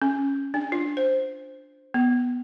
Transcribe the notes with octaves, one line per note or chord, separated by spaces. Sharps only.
C#4
D4
F4
C5
B3